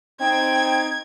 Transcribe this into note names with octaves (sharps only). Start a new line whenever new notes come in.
C4 D#4 G5 G#6